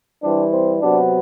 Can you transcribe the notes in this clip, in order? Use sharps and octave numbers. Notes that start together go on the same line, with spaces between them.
E3 G3 C4 D4
C4
C3 F#3 B3 D4